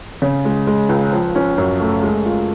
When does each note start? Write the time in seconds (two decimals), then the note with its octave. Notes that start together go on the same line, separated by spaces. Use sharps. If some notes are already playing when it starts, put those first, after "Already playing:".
0.22 C#3
0.45 G#3
0.67 G#3
0.89 C#2
1.12 F3
1.36 C#4
1.58 F#2
1.80 A3
2.03 G#3
2.25 F4